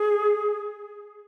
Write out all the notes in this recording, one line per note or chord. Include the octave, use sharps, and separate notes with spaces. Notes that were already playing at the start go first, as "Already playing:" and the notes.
Already playing: G#4